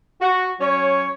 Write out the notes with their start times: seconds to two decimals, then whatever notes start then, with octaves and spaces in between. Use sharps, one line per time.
0.22 F#4
0.61 F#3 C#4 C#5